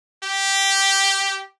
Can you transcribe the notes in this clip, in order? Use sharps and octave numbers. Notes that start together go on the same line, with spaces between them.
G4